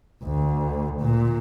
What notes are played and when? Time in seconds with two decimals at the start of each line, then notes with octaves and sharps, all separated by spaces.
0.24 D2
1.00 A#2